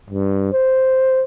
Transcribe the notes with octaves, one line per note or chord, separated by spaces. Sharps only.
G2
C5